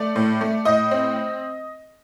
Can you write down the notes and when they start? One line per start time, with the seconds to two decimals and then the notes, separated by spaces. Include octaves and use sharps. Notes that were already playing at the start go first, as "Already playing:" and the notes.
Already playing: A3 D5
0.16 A2
0.41 A3
0.65 A2 D#5
0.91 C4